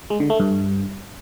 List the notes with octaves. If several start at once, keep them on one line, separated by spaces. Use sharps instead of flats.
G#3
D3
A3
G2